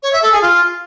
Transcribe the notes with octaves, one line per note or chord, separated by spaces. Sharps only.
C#5
E5
A4
G#4
F4